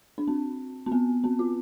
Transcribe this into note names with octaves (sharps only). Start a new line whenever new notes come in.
D4
C4
C4
B3
C4
F4